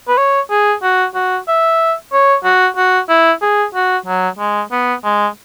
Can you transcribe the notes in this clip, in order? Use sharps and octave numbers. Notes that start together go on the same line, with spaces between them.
B4
C#5
G#4
F#4
F#4
E5
C#5
F#4
F#4
E4
G#4
F#4
F#3
G#3
B3
G#3